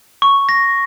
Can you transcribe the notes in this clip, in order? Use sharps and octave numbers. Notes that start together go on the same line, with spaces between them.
C#6
A#6